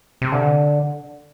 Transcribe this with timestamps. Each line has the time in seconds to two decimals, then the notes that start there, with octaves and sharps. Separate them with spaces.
0.22 C3
0.32 D3